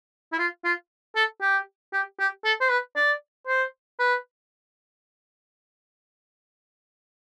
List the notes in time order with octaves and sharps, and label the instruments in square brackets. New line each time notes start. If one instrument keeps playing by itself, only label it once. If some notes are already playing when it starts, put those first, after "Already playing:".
[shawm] E4
F4
F4
A4
G4
G4
G4
A4
C5
B4
D5
C5
B4